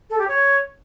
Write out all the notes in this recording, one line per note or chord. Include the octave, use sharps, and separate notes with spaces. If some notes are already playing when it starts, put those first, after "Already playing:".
A4
G4
C#5